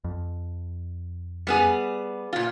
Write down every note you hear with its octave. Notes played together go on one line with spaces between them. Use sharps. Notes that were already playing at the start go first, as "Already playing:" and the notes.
F2
G3 B3 G#4
A#2 F4